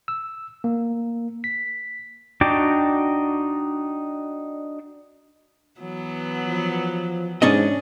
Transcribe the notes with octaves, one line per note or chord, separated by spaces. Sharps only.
E6
A#3
B6
D4 D#4 F#4 G5 D6
E3 F#3 B3
F3
G#2 C#4 D4 D#5